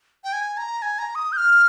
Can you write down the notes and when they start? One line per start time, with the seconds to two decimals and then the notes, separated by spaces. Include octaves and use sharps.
0.24 G5
0.33 G#5
0.57 A#5
0.82 G#5
0.99 A#5
1.15 D#6
1.32 G6
1.37 F6